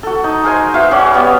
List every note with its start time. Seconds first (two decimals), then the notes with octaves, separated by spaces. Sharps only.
0.03 F#4 A4
0.24 D#4
0.44 G#3 A#4 C5 G#5
0.74 F#4 B4 E5 F5
0.91 C#4 F#4 D5
1.11 G3 B3 F5 B5